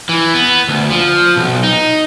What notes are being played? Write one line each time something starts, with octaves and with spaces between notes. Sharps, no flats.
E3
B3
D2
F3
B1
D#4